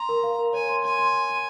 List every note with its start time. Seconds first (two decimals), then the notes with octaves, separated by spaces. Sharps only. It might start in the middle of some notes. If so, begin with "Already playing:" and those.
Already playing: A#5 C6
0.09 A#4
0.23 F5
0.39 A#4
0.53 C#5 G#5
0.69 C6
0.84 G#5 C6
0.98 C6
1.14 C6
1.29 C6